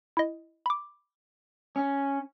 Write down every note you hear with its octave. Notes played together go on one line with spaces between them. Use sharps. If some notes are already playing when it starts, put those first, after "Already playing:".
E4 D#5
B5 D6
C#4